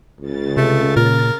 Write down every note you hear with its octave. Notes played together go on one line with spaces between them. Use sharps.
C#2 C#3 A6
C3 A3
A#2 A#4